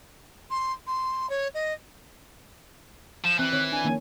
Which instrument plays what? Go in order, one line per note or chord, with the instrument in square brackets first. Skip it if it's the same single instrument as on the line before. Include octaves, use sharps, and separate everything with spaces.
[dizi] C6
C6
C#5
D#5
[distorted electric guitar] F3 [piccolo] E7
[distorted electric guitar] E3 [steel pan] C4 [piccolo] F#6
[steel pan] D#3 C4 C#5
[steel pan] D4 [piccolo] G#5
[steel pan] D#3 A#3 C#4